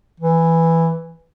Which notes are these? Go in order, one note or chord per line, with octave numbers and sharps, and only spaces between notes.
E3